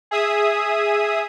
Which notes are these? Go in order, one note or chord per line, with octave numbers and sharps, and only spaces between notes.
G#4 E5 D#6